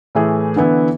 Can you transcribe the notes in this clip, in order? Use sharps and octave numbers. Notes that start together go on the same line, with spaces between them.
A2 E3 A3 G#4
D3 E3 B3 E4